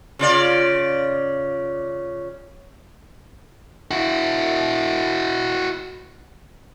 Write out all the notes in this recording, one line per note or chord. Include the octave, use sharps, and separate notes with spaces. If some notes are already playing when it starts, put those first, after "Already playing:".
C#3 F4 D5
E4 F#4